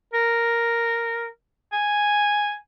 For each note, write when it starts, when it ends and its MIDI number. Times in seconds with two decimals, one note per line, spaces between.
0.14 1.27 70
1.73 2.55 80